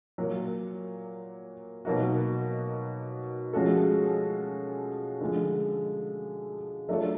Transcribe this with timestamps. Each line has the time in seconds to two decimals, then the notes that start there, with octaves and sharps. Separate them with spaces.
0.18 A#2 F#3 A#3
1.85 B2 F#3 A#3 D#4 F#4
3.53 F3 G#3 C#4 F#4 A4
5.21 D3 F3 G#3
6.89 F#3 A3 D4 F4 A4